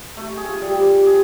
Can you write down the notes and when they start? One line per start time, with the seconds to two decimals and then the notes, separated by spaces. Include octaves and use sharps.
0.17 A3
0.37 G#4
0.49 F4
0.62 G3
0.79 C5
1.07 G#4